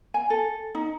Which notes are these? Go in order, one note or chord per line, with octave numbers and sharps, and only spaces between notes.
G#5
A4
D#4